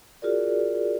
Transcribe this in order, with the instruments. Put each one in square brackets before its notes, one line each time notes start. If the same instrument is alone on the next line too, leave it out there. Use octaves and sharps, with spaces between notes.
[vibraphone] F4 F#4 G#4 A#4 D5